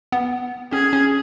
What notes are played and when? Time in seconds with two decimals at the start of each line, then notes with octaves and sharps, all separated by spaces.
0.12 B3
0.72 C#4 G#4
0.93 C#4